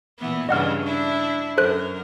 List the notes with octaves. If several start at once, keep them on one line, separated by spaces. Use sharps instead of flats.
A#2 E3 B3
G2 C#3 E3 D#5 F#5 F6
D4 E4
F#2 A4 A#4 C5 F#6